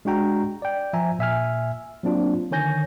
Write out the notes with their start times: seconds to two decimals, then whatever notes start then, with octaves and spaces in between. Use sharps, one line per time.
0.05 G#3 D4 F#4 G5 A#5
0.62 D5 G5
0.93 F3 E5 G#5 A#5
1.19 A#2 E5 G#5 F6
2.03 F#3 A#3 C4 D4 F4
2.51 D3 D#3 C#5 G#5 G6 A#6